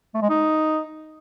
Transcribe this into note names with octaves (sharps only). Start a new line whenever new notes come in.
A3
G#3
D#4